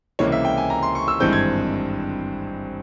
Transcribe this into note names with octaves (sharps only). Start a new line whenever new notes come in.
C#2 C3 E3 A#3 C#5
E5
G5
G#5
A#5
C6
C#6
E6
G#1 G2 E3 G#3 C4 G6
G#6